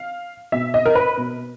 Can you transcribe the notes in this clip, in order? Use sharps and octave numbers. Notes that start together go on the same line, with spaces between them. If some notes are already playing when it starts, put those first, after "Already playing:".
Already playing: F5
B2 E5
D#5
A#4
B4
B2